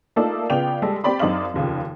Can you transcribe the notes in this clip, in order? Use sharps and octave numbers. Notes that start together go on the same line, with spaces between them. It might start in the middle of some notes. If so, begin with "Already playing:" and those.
A3 A#3 D#4 F4 A4 D5
C#3 B3 F4 D5 G5 F7
G3 G#3 A4
C4 G4 D5 B5 C6
F#2 C4 D#4 D5 F5 F#7
F1 D#2 C#3 F4